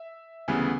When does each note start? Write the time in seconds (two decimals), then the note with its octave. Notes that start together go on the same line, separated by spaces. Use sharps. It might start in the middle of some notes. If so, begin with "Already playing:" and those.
Already playing: E5
0.48 D2 C#3 E3 G3 B3 G#5